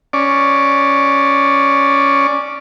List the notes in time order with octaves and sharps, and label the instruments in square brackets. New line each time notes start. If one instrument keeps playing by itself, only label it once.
[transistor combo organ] C#4 D5